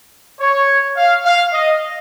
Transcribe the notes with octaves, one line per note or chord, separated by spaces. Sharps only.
C#5
F5
F5
D#5